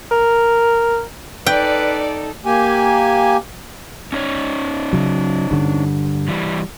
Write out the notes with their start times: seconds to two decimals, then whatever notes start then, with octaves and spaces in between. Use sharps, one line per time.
0.11 A#4
1.46 D#4 A4 B4 D5 G5
2.46 A#3 G4 G#5
4.13 C#4 D#4 C#5
4.93 C#3 F#3
5.51 G2 D3
6.29 E3 G3